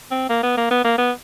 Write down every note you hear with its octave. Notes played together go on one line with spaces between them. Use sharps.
C4
A#3
B3
A#3
B3
A#3
B3